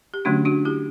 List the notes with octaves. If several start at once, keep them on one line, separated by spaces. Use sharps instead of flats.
G4
D3 F#3 A3 C#4 D4 F#4
D4 F#4
E4 G4